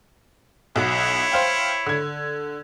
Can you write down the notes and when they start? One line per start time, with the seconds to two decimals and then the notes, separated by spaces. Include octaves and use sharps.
0.76 B1 E4 F#4 C#5
1.32 C5 F5 G5
1.86 D3 G#6